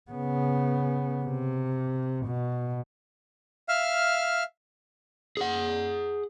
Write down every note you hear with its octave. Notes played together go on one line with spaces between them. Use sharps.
C#3 B3
C3
B2
E5 F5 F6
G#4 F#5